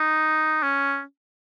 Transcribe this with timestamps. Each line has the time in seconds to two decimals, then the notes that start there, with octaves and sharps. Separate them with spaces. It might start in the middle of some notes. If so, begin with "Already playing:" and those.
Already playing: D#4
0.63 C#4